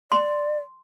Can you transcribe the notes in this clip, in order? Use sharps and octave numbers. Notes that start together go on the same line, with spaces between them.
D5 C6